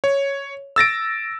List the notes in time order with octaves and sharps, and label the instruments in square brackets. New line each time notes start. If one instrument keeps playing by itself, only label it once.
[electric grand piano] C#5
E6 A6 A#6 D7